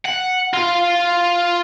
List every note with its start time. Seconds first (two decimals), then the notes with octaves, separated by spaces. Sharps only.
0.06 F#5
0.54 F4